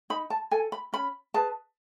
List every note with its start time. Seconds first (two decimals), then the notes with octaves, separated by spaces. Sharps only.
0.10 D#4 B5
0.30 A5
0.51 A4 G#5
0.72 B5
0.93 C#4 B5
1.34 G#4 B4 A5